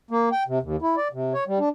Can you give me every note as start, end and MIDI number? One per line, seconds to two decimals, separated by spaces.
0.11 0.29 58
0.32 0.43 79
0.48 0.59 48
0.63 0.76 39
0.82 0.95 64
0.97 1.08 74
1.13 1.33 48
1.33 1.44 73
1.47 1.59 55
1.59 1.69 62